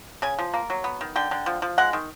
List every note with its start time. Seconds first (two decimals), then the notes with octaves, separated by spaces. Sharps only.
0.22 C#3 G#5
0.39 F3
0.54 A#3
0.70 F#3
0.84 B3
1.01 D#3
1.16 D3 G5
1.31 D3
1.46 F3
1.62 F3
1.78 G#3 F#5
1.93 D#3